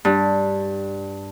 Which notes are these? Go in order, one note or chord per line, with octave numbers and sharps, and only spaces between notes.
G2